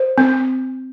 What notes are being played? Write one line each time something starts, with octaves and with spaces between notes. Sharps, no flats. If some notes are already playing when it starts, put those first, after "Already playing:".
Already playing: C5
C4